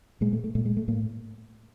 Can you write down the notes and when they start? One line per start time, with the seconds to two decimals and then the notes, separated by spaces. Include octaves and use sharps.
0.21 A#2 G#3
0.33 A3
0.44 A3
0.55 A#2 A3
0.65 G#3
0.77 A3
0.88 A2 A#3